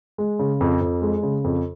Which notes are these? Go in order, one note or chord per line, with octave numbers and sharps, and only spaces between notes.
G#3
C#3
F2
F2
G#3
C#3
F2